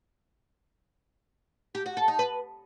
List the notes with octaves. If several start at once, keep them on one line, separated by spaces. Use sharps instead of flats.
G4
F#4
A4
D#4
B4